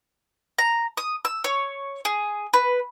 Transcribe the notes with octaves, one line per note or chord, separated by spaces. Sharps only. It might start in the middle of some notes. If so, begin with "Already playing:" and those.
A#5
D#6
E6
C#5
G#4
B4